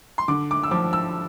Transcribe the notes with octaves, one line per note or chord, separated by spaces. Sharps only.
C6
D3 D6
D6
E6
F3 D6
E6